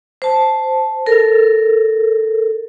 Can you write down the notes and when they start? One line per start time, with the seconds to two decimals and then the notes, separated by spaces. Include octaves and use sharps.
0.22 C5 A5
1.06 A4 A#4